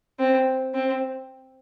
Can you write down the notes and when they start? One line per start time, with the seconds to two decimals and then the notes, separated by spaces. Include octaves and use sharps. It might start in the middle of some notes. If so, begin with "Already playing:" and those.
0.19 C4
0.74 C4